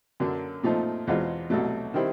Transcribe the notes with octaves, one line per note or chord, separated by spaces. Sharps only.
F#2 D3 F#3 A#3 D4
A#2 F3 A3 C4 D#4
E2 B2 G#3 C4 F4
C2 B2 F#3 A3
D#3 G3 C4 E4